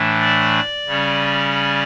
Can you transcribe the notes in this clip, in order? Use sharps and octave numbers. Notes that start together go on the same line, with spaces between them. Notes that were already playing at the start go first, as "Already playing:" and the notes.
Already playing: A2 E3 A3 D4
D5
C#3 G3 C#4